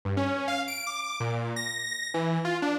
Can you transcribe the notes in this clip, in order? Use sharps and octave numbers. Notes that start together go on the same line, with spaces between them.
G2
C#4
F5
D7
D6
A#2
A#6
E3
F4
D4